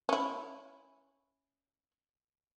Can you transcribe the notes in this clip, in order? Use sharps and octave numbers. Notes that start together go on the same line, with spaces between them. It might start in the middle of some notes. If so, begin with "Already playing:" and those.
C#4 E4